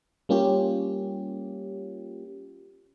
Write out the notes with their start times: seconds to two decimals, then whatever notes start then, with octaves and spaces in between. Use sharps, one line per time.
0.29 G3 A#3 C#4 F4 G4